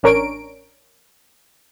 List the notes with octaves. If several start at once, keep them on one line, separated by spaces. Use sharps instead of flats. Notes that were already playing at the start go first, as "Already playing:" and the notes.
A1 C#4 D4 A#4 C#5 D7